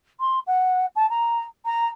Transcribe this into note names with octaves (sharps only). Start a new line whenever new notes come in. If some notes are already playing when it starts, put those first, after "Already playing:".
C6
F#5
A5
A#5
A#5